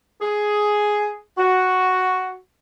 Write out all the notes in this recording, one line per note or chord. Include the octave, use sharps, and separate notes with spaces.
G#4
F#4